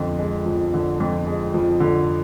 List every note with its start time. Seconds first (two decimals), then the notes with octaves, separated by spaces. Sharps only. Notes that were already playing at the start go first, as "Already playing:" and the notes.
Already playing: F2 D3 F3
0.19 G#3
0.46 F3
0.74 D3
1.00 F2
1.27 G#3
1.54 F3
1.80 D3